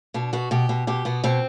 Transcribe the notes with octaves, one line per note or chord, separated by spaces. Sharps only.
B2 D4
B2 F#4
B2 G4
B2
B2 G4
B2 B3
B2 C4